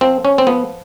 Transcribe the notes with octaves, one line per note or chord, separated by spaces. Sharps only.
F3 C4
C#4
C4
F3 B3